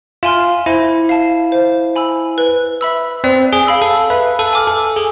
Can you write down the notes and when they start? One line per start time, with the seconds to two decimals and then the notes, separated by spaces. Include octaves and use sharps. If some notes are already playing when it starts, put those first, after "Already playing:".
0.23 F4 E5 G#5 C6 F6
0.66 E4 C5
1.09 F5 A5
1.52 C5
1.96 G#5 B5 E6
2.38 B4
2.81 E5 B5 E6
3.24 C4 D5
3.53 G#4
3.67 F5 B5 E6
3.82 A4
4.10 B4 E5
4.39 A4
4.53 G#5 D6 F6
4.67 A4
4.96 G#4 A4